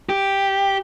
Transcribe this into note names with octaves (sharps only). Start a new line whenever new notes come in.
G4